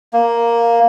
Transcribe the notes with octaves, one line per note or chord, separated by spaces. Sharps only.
A#3